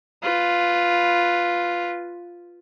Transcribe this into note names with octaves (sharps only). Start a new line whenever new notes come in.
F4 B4